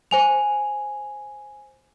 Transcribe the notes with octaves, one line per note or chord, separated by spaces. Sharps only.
C5 G#5 F7